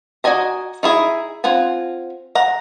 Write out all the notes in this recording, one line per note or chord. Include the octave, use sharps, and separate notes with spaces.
F#4 D5 D#5 G#5 A#5
D#4 E4 G#4
C4 F4 F#5 G#5
F#5 A#5